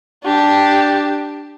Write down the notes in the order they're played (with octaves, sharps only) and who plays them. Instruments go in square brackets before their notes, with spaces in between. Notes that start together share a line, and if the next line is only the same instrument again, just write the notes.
[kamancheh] D4 G4